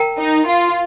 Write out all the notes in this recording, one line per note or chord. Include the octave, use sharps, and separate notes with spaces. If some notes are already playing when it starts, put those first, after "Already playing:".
Already playing: A#4 G5 A#5
D#4
F4